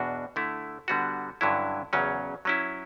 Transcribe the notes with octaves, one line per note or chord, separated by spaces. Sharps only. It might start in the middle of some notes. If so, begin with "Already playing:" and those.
Already playing: E2 B2 D4 F#4
D3 A3 E4
D3 G3 B3 F#4
G2 D3 F#3 C#4 E4
E2 C#3 F#3 C#4
F#3 C#4 E4